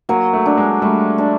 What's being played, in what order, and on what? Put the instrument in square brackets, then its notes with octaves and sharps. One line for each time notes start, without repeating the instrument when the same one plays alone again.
[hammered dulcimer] F#3 [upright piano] A#3
[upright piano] A3
[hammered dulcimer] D4
[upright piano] G#3
[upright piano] G3 [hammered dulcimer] A3
[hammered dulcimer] D4